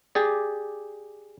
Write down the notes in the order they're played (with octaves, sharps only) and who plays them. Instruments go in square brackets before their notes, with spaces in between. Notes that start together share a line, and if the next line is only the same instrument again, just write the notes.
[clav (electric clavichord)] G4 G#4 D5